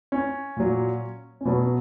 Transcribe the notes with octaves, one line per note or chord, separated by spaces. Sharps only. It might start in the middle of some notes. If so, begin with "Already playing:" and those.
C#4
A#2 F#3
C#4
B2 F#3 B3